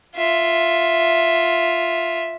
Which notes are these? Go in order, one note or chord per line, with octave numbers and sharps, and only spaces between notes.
F4 E5